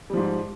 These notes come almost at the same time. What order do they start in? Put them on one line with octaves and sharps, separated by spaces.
G3 F3 G#2